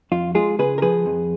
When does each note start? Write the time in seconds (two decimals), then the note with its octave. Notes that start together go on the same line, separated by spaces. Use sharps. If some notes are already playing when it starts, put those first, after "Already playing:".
0.12 F2 F4
0.35 G#3 F4 G#4
0.59 C#3 G#4 B4
0.78 A#4
0.82 F3 G#4 B4
1.06 F2